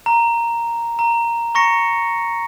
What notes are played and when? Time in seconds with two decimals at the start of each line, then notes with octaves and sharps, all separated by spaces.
0.06 A#5
0.99 A#5
1.55 A#5 C#6 A#6 C#7